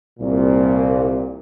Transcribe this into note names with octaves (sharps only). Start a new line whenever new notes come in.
C2 A#2